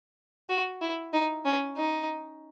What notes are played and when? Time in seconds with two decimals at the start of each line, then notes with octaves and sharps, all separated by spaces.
0.49 F#4
0.81 E4
1.13 D#4
1.45 C#4
1.77 D#4